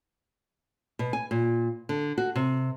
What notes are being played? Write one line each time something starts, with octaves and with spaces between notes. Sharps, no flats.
B2
G#5
A#2
D3
F#4
C3